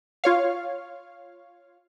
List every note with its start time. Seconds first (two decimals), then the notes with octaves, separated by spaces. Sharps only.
0.24 F4 C#5 F5